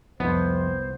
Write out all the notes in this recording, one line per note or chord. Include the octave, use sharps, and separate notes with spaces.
C2 F2 C3 B3 C5